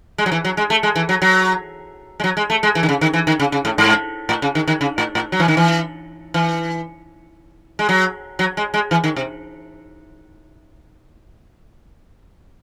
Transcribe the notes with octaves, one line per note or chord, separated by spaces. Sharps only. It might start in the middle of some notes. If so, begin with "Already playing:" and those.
G#3
F#3
E3
F#3
G#3
A3
G#3
E3
F#3
F#3
G#3
F#3
G#3
A3
G#3
E3
D#3
C#3
D#3
E3
D#3
C#3
C#3
A2
G#2
A2
C#3
D#3
D#3
C#3
A2
A2
F#3
E3
D#3
E3
E3
G#3
F#3
F#3
G#3
G#3
E3
D#3
C3